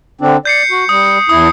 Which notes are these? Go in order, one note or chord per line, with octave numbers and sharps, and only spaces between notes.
D3 C4 D4
D5 G6 C7 C#7
F#4
G3 D#6
E2 E4 D#6